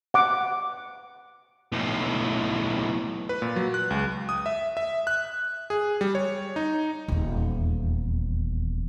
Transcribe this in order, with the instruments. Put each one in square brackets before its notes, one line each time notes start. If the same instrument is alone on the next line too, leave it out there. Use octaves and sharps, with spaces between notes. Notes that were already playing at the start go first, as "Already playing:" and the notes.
[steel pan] F#5 D6
[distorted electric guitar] B1 A2
[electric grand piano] B4
A#2
F#3
F#6
C#2
D#6
E5
E5
F#6
G#4
G3
C#5
D#4
[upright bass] D#1 E2